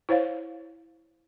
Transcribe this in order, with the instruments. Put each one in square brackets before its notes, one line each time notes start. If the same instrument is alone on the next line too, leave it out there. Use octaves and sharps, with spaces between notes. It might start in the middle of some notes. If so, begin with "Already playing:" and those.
[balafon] E4 C5 C#5 F5